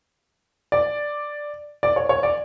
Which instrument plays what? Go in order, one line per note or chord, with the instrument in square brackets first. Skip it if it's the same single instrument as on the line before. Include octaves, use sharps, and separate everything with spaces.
[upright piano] D5
D5
C#5
C#5
D5